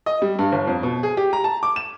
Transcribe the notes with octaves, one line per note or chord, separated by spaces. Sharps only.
D#5
G3
G2
G1
F2
B2
G#4
G4
A#5
A5
D6
E7